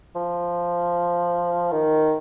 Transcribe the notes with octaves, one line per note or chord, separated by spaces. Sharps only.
F3
D#3